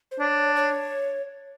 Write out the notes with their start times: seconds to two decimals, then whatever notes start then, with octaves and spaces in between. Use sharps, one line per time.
0.11 C5
0.19 D4 C#5
0.56 C#5